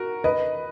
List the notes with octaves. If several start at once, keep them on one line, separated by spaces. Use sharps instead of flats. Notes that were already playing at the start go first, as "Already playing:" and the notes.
Already playing: F#4 A#4
B4 D#5